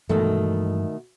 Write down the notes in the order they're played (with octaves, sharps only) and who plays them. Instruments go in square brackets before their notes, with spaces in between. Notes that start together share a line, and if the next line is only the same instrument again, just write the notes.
[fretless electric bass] G2 E3 G#3 [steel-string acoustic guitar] B2 D#3 A3